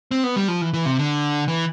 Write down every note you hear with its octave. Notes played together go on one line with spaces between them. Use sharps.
C4
B3
G3
F3
E3
E3
C3
D3
E3